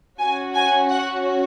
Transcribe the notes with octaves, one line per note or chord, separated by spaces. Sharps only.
C#4 F#4 G#5
G#5
F#5